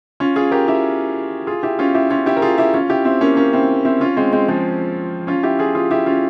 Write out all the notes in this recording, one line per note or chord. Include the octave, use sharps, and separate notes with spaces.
C#4 F4
F4 G#4
G4 A#4
E4 G4
F4 G#4
E4 G4
C#4 F4
E4 G4
C#4 F4
E4 G4
A#4
F4 G#4
E4 G4
C#4 F4
E4 G4
C4 E4
A#3 C#4
A#3 C#4
C4 E4
C4 E4
C#4 F4
G#3 C4
G#3 C4
F3 G#3
C#4 F4
E4 G4
F4 G#4
F4 G#4
E4 G4
C#4 F4